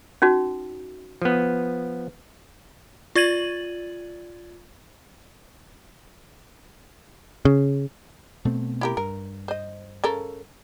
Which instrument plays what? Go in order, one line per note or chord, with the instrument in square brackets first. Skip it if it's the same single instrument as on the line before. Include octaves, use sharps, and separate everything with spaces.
[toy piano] C#4 D#4 F#4
[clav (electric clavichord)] F3 B3
[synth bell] F4 D5 G#6 A6 D#7 F#7
[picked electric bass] C#3
[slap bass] B2 A3 C4
[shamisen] E4 G4 A#4
[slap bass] G2 [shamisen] A#4
[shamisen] C5 D#5
C#3 A4 A#4